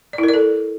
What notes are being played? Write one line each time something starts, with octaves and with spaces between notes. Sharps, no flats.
D5
E4
A#4
D5
A4